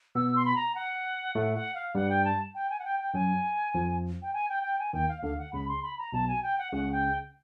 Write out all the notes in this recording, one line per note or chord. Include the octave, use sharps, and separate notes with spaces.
B2 B3 E6
C6
B5
A#5
F#5
A2 A3 F#5
F#5
F5
G2 G3 F#5
G5
A5
G5
G#5
F#5
G5
G5
F#2 F#3 G#5
F2 F3
G5
G#5
G5
G5
G#5
D#2 D#3 G5
F5
D2 D3 F5
F#5
C#2 C#3 B5
C6
B5
A#5
B1 B2 A5
G#5
G5
F#5
C#2 C#3 F#5
G5